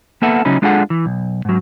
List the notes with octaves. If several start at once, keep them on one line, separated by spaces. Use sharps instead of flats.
A#3 B3 A4 E5 F#5
C#3 F#3 C#4 D#4 E4
G#3 D4 F4 G#4 A4 F#5
E3
B1
G#2 F#3